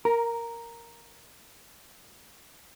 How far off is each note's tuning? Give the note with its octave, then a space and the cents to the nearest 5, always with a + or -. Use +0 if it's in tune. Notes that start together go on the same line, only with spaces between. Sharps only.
A#4 +0 A#5 +20